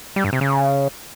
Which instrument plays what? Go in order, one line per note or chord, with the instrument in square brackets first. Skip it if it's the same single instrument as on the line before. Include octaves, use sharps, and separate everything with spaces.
[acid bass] G3
G2
C3
C#3